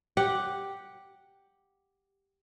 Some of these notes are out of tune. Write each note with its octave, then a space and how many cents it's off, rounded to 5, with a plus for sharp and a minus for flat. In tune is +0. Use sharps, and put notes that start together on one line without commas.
G4 +0 F#5 +0